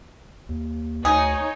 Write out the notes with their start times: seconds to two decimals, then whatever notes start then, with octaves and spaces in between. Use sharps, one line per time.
0.49 D#2
1.05 D2 D#4 G#4 C#5